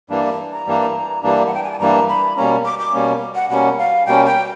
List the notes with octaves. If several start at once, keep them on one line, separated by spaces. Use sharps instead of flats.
G2 E3 G3 A#3 D4
A#5
G2 E3 G3 A#3 D4
G2 E3 G3 A#3 D4
F#5
G5
G#5
A5
G2 E3 G3 A#3 D4 A#5
B5
B2 G3 A#3 C#4 A#5
D6
D6
B2 G3 A#3 C#4
F#5
B2 G3 A#3 C#4 F#5
F5
B2 G3 A#3 C#4 G5
G5